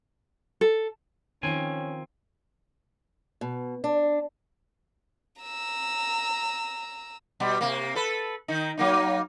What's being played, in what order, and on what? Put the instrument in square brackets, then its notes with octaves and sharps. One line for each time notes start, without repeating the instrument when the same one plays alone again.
[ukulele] A4
[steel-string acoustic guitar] D#3 F3 [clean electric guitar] C4 G#5 [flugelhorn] C#4
[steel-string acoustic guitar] B2
D4
[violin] A#5 E6
[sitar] B2 G3
C3 A#3
A4 B4
D#3 D#4
F#3 A#3 D#4